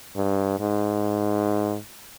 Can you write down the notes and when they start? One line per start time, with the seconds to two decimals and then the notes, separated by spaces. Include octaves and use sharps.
0.16 G2
0.60 G#2